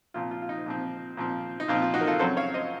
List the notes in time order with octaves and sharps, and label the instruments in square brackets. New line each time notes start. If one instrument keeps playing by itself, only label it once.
[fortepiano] A#2 F3 C4 F4
F4
F4
D#4
A#2 F3 C4
A#2 F3 C4
D#4
A#2 F3 C4 F4
F4
D#4 F#4
A#4
F4 A4
F#2 C#3 F#3 C4 A4 C5
C#5 F5
C5 D#5